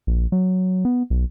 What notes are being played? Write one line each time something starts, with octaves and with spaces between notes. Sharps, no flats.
A#1
F#3
B3
B1